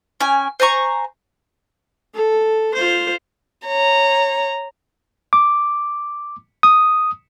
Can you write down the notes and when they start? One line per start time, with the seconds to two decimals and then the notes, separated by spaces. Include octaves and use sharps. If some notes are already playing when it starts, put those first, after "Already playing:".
0.21 C#4 G5 G#5
0.60 C5 G#5 A#5 C#6
2.14 A4
2.74 F4 C5
3.67 C#5 A#5
5.33 D6
6.63 D#6